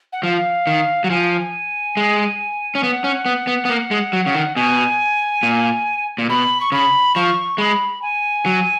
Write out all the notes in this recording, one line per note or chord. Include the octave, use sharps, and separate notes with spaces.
F#5
F3 F5
D#3
F#3 F#5
F3 G#5
G#3
C#4
B3 F#5
C#4
B3
B3
B3
A#3
G#3
F#3
C#3
D#3
B2 G#5
A#2
A#2
B2 B5
C#6
C#3 B5
F3 C#6
G#3 B5
G#5
F#3